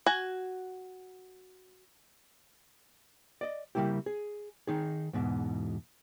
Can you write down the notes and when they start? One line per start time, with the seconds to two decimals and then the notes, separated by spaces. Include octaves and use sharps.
0.06 F#4 G#5
3.41 D5 D#5
3.75 C#3 G3 A#3 E4 G4
4.06 G#4
4.67 D#3 D#4 G#4
5.13 E2 G#2 B2